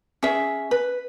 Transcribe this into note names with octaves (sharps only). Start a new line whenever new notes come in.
C#4 G#4 E5
B4